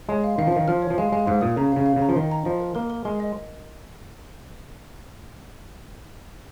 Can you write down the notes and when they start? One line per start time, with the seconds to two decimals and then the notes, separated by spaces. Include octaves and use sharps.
0.09 G#3 C#5
0.24 F5
0.38 D#3 F5
0.47 F3
0.52 D#3 F5
0.68 F3 F6
0.82 C#5
0.90 F3
0.98 G#3 F5
1.12 G#3 F5
1.27 G#2 F5
1.41 A#2 D#6
1.57 C#3 A#5
1.72 C#3 F5
1.86 F5
1.96 C#3
2.02 A#5
2.09 F3
2.16 D#3 A#4
2.31 A#5
2.45 F3 D#5
2.60 A#4
2.75 A#3 A#4
2.90 A#4
3.05 G#3 A#4
3.20 D#5